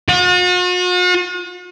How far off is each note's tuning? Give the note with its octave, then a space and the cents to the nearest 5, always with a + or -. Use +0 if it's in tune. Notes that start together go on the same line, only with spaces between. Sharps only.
F#4 -45